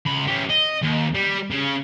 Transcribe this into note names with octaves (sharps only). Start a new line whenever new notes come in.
C#2 B5
C#4 G4
D#5
D#2
G3
C#3